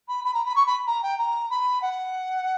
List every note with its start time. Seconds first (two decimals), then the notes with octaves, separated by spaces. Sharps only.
0.08 B5
0.24 B5
0.34 A#5
0.45 B5
0.55 C#6
0.66 B5
0.87 A#5
1.03 G5
1.18 A#5
1.50 B5
1.81 F#5